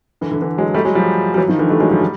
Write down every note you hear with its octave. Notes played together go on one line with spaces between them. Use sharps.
D3 E3
D3 E3
D3 E3
F#3 G#3
G3 A3
F#3 G#3
F3 G3
G3
E3 F#3
D#3 F3
D3 E3
G3 A3
F#3 G#3
F3 G3
G3